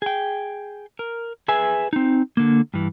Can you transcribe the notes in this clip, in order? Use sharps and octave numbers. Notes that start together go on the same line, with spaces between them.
G#4 G5
A#4
G#4 B4 E5 G#5
C4 D#4
D3 A#3
G2 E3